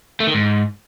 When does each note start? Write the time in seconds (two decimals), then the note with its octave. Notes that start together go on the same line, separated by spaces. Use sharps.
0.20 A3
0.27 D#3
0.34 G#2